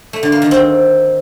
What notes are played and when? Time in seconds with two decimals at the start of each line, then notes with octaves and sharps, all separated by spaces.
0.13 A3
0.23 D3
0.32 A#3
0.42 D#3
0.51 C4